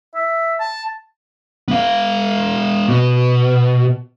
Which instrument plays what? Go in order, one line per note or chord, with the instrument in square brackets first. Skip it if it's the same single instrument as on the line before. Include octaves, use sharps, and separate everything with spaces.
[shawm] E5
A5
[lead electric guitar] B3 F5
B2